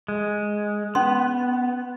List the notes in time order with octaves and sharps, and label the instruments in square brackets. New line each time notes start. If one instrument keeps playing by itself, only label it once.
[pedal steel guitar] G#3
[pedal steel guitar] B3 [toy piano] C#4 C6